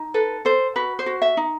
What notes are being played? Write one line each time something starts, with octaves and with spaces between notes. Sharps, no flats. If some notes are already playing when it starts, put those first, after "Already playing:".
Already playing: D#4
A4 B4
A4 C5
F#4 B4
C5
F#4
E5
D#4